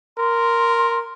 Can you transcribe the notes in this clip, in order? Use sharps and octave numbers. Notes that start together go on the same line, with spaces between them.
A#4 C6